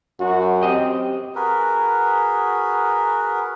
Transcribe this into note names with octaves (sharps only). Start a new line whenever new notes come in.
F#2 F#4
C4 G4 D#5 G5
F#4 G#4 A#4 B4